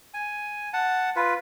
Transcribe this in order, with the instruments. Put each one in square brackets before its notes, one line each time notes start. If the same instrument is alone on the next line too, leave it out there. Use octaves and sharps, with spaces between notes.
[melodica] G#5
F#5 A5
F4 B4